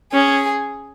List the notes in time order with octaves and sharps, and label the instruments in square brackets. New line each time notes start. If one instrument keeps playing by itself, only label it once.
[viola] C#4 [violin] G#4